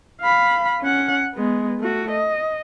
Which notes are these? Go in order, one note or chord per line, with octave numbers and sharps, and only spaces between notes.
F5 B5
C#4 F#5
G#3 B3
A3 F#4
D#5